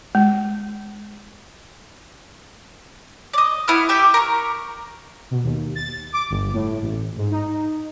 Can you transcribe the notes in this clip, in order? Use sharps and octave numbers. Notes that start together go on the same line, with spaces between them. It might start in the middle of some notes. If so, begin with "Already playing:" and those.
G#3
D5 D#5
B3 E4 B4 F6
G4 E5 G5
A#4 C#6
B2
D#2
A6
D6
G1
A2
A1
G#2
D#4